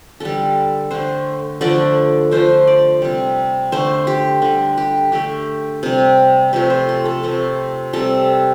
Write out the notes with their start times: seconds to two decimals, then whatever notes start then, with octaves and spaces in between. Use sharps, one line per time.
0.20 D3 G3 A4
0.91 D3 A3 C5
1.61 D3 F3 A3 D5
2.31 D3 F3 A3 C5
2.67 D5
3.02 C3 G3
3.72 D3 A3 C5
4.07 G4
4.42 D3 G3
4.77 G4
5.12 D3 A3 G4
5.83 C3 G3
6.53 C3 F3 A3
6.70 C5
6.89 A4
7.05 A4
7.23 C3 F3 A3 C5
7.93 C3 G3 A4